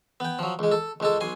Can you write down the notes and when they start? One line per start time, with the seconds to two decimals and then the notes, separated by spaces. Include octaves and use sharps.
0.20 B3 G5
0.39 F3 F#3
0.59 C#2 G#3
0.72 A4
1.00 C#2 G#3 A4
1.21 B1 G#5 C6